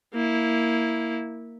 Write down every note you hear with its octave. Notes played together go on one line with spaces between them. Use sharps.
A#3 E4